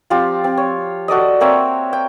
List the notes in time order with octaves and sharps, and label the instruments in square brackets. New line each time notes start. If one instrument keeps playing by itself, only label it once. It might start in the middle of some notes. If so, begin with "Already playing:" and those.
[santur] F3 C4 F4 G4
C4
C#5
F#4 A4 D5 D#5
A#3 C4 C#5 E5
G5